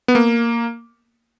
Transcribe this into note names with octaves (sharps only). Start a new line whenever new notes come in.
B3
A#3